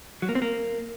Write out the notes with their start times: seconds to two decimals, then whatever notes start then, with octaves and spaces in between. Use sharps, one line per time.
0.22 F#3
0.29 A#3
0.35 C4
0.42 A#3